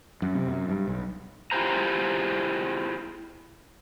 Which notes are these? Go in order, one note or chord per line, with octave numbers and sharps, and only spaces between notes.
F#2
C3
F#2
G2
B1
E4 F4 G4 G#4 C5 A#5